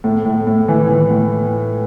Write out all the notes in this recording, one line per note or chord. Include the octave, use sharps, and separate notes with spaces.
A2
A2
A2
E3
E3
A2